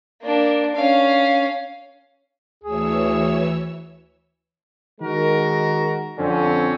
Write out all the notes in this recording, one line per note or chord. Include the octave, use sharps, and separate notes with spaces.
A#3 D4
C#4 F5
D2 E3 G#4 C#5 E6
D#3 G#3 F#4 A#4
F2 D3 C4 C#4